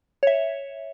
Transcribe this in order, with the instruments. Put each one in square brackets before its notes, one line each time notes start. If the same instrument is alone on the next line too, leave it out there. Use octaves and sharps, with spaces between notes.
[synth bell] C#5 E5